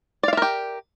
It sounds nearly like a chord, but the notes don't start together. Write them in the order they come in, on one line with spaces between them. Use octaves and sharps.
D5 F5 E5 A#4 G4